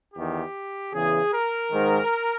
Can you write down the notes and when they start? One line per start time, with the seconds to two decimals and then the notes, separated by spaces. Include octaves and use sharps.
0.15 E2 D#3 G4
0.93 E2 C#3 E3 G#4
1.32 A#4
1.71 G#2 D#3